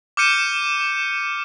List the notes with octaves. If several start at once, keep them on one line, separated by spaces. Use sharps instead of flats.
D6 F6 G6 C#7 D#7 E7